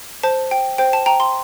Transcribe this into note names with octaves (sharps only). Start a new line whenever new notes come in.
C5 A5
G5
C5 G5
A5
G5 A#5
C6